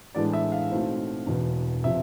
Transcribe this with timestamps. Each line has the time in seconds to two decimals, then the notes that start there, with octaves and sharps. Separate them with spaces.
0.15 A2 E3 G#3 B3 D4 D5
0.33 E5
0.52 F5
0.71 B1 B2 A3 C4 E4
1.27 E1 E2 B2
1.84 C3 F3 E5